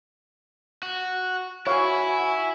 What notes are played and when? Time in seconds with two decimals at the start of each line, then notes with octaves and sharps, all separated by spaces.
0.83 F#4
1.67 E4 F#4 C#5 F5 G#5